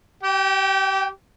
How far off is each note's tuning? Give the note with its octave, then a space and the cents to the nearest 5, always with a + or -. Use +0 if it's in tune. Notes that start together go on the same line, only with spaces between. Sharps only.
G4 -30 G5 +5